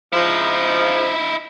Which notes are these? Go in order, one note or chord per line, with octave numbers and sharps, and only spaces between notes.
G#2 C#3 F3 D#4 E4